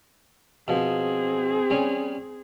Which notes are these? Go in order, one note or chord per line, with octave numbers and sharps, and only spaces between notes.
B2 F3 C4 G#4
G3 C#4